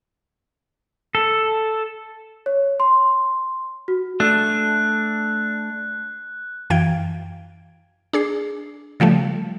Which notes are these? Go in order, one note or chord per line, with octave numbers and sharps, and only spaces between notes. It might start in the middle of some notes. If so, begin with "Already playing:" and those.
A4
C#5
C6
F#4
A3 D4 F#6
F#2 E3 F5 G5 G#6 D7
D4 G#4 C7
C#3 F3 G3 A3